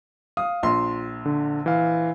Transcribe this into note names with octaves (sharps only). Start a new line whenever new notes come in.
F5 D#6
A#1 F4 C6
D3
E3 F5